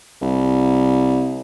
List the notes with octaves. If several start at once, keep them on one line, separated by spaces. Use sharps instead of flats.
C2